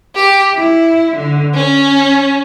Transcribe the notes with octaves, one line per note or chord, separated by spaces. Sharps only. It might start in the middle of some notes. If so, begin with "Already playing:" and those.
G4
E4
D3
C#4